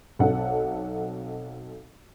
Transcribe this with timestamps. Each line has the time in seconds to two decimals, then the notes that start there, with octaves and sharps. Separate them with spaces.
0.19 B1 C4 D#4 A4 F#5